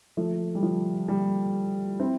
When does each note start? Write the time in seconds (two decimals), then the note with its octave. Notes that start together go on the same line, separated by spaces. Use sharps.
0.17 F3 A3
0.55 G3
0.63 F3
1.08 G3
2.00 C4 E4